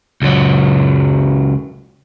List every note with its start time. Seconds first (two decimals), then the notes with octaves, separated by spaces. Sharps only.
0.22 C#2 F#3